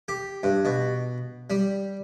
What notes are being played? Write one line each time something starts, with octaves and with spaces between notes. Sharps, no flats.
G4
G2
B2
G3